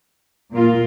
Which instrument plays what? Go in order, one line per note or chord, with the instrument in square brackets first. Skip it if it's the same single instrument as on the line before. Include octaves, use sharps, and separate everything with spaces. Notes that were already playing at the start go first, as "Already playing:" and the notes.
[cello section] A#2 A#3 F4